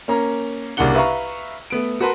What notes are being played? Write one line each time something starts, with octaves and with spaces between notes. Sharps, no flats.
A#3 C#4 A#5
C2 C#3 A#3 D4 F#5 G7
B4 E5 F5 A#5 C#6
A3 B3 D7
F#4 A#4 B4 A5 C6